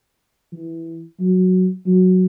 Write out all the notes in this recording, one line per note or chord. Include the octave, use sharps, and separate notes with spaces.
E3
F#3
F#3